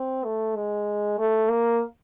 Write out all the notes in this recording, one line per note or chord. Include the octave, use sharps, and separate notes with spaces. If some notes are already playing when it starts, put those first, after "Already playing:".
Already playing: C4
A3
G#3
A3
A#3